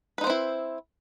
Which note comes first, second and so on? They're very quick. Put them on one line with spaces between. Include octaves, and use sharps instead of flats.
B4 D#4 C5 C4 E4